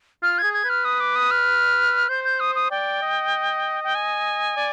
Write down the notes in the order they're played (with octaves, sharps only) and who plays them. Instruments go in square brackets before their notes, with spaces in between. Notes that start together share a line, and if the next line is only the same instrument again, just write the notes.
[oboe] F4 [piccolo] F6
[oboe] G#4 [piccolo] G#6
[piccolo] G#6
[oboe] B4 [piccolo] F6
[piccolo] D#6
D6
D#6
F6
[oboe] C5 [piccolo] G6
[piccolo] G6
D#6
D#6
[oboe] D5 [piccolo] G5
[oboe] D#5
[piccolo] G5
G#5
[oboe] D5